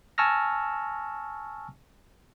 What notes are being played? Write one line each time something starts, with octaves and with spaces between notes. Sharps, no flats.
G#5 A5 C#6 E6 F6 A#6